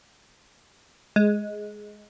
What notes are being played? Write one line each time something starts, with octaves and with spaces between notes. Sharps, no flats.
G#3